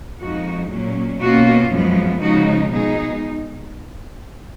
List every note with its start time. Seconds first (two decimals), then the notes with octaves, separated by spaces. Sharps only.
0.18 F2 F3 G#3 D#4 F#4
0.70 A#2 F#3 C#4
1.21 B2 A#3 C#4 F4 F#4
1.71 F#2 F3 G#3 B3
2.22 C#3 F3 G#3 D#4 F#4
2.73 B2 G#3 D#4 G#4